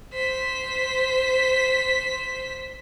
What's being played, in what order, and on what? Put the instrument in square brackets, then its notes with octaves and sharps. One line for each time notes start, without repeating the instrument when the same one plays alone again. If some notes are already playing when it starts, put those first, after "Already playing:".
[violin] C5 B6